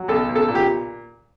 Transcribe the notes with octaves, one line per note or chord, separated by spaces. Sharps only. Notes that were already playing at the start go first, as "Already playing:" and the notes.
Already playing: F#3
B1 A4
B1
A4
A#2
G4